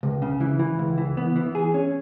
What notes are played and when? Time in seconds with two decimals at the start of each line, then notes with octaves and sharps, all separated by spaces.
0.03 C#2
0.22 C#3
0.41 E3
0.60 E3
0.79 C#2
0.98 E3
1.17 B3
1.36 E3
1.55 G#4
1.74 C#4